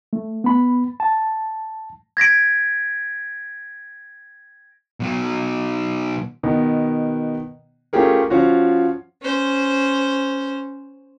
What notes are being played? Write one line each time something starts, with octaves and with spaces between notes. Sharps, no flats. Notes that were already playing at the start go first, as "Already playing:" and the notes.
A3
B3 B5
A5
G#6 A#6 B6 D7
B2 F#3
B2 D#3 B3
A3 C#4 F4 G4 G#4 A#4
F3 C#4 F4 F#4
C#4 C5